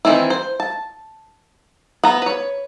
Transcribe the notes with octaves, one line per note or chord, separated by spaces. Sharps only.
D#3 E3 C4 E4
C5
A5
B3 A#5
B4 C#5